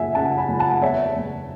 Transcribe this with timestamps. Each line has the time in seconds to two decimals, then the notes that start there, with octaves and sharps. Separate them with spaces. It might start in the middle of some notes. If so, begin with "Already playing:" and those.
Already playing: F#1 E5 F#5 G#5
0.15 C#3 F#5 A5
0.38 G#5 B5
0.48 F#1
0.59 F#5 A5
0.82 E2 C#5 E5
1.16 F#1